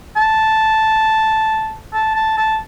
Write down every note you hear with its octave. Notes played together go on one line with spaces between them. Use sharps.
A5
A5
A5
A5